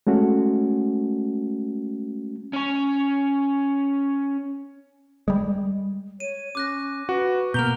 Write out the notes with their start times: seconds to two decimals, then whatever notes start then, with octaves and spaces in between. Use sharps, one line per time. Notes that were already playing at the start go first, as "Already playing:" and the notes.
0.07 G#3 A3 C#4 F#4
2.53 C#4 C#5
5.28 G3 G#3
6.20 C#5 D#7
6.55 C#4 D6 F#6 A#6
7.09 F#4 B4
7.54 B2 A#3 A#5 F6 G6 F7 G7